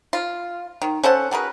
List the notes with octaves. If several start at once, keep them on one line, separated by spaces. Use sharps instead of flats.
F4
D#3
C#4 A4 C5 F#5
F#4 G#4 A#4 B4